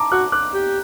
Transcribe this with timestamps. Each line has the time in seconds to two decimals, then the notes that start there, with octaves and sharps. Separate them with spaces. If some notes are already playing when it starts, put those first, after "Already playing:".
Already playing: A5 A#5 D6
0.12 F#4 D6 F#6
0.32 D6 F#6
0.54 G4